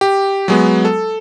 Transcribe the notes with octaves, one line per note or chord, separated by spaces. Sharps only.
G4
F#3 G#3 B3
A4